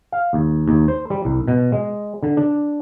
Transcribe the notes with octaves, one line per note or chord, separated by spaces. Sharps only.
F5
D#2
D#2
C5
G3
C2
B2
G#3
D3
D4